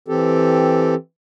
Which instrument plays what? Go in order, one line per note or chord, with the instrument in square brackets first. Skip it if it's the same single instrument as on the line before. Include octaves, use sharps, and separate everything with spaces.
[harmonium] E3 C4 G4 A4